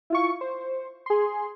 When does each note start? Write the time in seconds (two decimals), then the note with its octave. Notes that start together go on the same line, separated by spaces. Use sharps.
0.10 E4 F4 C#6
0.41 C5
1.06 G#4 C6